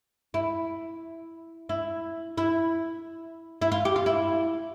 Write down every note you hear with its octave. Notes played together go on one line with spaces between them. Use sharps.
E4
E4
E4
E4
F4
G4
F4
E4